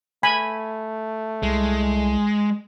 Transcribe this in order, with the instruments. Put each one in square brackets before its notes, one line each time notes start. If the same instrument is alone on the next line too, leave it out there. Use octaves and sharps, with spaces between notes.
[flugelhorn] A3 [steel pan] G#5 B5
[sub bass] C2 [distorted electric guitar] G#3